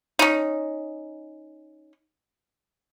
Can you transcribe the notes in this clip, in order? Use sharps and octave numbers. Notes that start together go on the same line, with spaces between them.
C#4 D#4